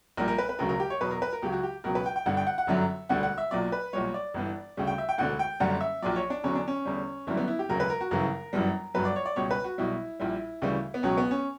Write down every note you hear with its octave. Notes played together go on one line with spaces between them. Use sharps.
A#1 A#2 G3 A#4
A#4
B4
B4
E1 D2 C#3 F#3 A#4
A#4
G4
C#5
E2 B2 F#3 B4
A#4
B4
A#4
C#2 C#3 F#3 G4
F#4
G4
C#2 B2 F#3 A#4
B4
G5
G5
G1 G2 D3 F#5
G5
F#5
F#5
G1 F#2 D3 F#3 E5
E1 D2 D3 G3 F#5
F#5
E5
B1 A#2 F#3 D5
B4
B1 A#2 G3 C#5
D5
G1 G2 E3 G3
D2 C#3 G3
G5
E5
G5
E1 D2 D3 F#5
G5
F#1 F#2 D3 G3 F#5
E5
A#1 A#2 F#3 D5
C#5
D4
E2 D3 F#3 C#4
D4
C#4
E2 D3 G3
F#1 F#2 D3 G3 E4
B3
E4
G4
E1 D2 C#3 F#3 A#4
B4
A#4
F#4
G1 F#2 C#3 E3 A#4
G1 F#2 E3 G3
G1 G2 F#3 B4
D5
C#5
D5
C#2 B2 G3 C#5
B4
F#4
B1 B2 G3 E4
A#1 A#2 G3 E4
D2 C#3 E3 G3
B3
C#2 B2 F#3 C#4
B3
C#4